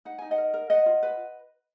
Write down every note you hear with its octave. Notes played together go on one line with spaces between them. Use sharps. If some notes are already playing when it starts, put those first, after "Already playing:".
D#4 F#5
D#4 G#5
D#5 F#5
A#4
A#4
B4 D#5 F#5
F4
B4